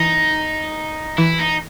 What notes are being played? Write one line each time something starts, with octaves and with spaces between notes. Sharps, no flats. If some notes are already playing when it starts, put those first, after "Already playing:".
Already playing: E3 D#4
E3 E4
D#4